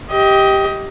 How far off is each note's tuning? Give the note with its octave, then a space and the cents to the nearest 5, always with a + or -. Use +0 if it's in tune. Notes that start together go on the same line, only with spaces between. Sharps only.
G4 +0 D#5 +20